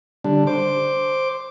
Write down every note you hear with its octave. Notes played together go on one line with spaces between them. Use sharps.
D3 G3 D4
C5 D6